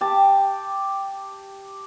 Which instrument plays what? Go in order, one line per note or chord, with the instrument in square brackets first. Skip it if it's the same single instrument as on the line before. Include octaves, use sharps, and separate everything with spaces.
[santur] G4 A5